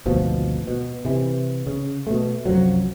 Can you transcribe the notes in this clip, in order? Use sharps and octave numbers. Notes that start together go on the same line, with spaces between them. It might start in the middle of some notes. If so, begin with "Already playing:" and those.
G#1 D2 B2 F3
B2
C3 E3
C#3
B2 A3
C2 F#2 F3 F#3